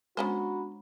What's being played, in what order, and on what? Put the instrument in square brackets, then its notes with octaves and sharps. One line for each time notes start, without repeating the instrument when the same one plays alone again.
[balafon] G#3 [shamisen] B3 C#4 C5 [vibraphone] D4 A#5 B5 [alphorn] F#4